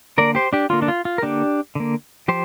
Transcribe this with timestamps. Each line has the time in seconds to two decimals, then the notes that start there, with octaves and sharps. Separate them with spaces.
0.18 D3 A#3 A#4 D5
0.35 G4 C5
0.53 D4 G4
0.70 D3 A#3 F4
0.82 D4
0.88 F4
1.05 F4
1.18 A#4
1.22 D3 A#3 D4 G4
1.75 D3 A#3
2.28 F3 G4 C5